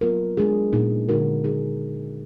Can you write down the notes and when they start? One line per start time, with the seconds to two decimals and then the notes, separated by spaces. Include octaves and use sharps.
0.01 F#3 B3 F4 A#4
0.37 G#3 D4 G#4
0.73 A#2 G#3 B3 D#4 G#4
1.09 D3 G#3 D#4 F#4 A#4
1.44 G#3 D#4 G#4